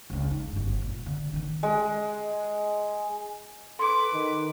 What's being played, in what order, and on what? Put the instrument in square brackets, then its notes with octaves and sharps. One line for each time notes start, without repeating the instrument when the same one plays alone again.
[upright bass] C#2 D4
D#4
G1 F#2
A#2
D3
D#3 D4
[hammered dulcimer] G#3
[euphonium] A4 [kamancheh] B4 D6 [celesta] C6
[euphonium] D#3